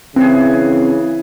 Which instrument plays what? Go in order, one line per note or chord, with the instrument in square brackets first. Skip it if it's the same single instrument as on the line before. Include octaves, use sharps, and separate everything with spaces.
[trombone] C#3 [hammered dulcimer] E3 G#4 [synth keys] C4